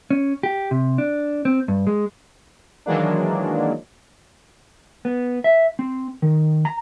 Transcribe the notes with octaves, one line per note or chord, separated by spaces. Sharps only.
C#4
G4
C3
D4
C4
G2
G#3
D#3 E3 F#3 G#3 A#3 D4
B3
E5
C4
D#3
A#5